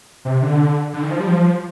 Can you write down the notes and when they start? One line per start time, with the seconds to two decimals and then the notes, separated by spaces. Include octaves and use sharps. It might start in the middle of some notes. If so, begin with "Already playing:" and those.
0.25 C3
0.42 D3
0.93 D3
1.02 D#3
1.10 F3
1.20 G3
1.27 F3